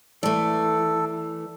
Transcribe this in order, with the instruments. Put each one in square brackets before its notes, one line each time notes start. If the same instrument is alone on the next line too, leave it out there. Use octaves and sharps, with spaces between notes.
[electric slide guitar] E3 [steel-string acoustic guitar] A3 D5 [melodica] A4